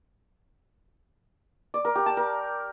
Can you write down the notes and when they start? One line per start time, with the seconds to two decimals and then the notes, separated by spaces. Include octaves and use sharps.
1.74 D5
1.85 A#4
1.95 G4
2.06 A5
2.17 A#4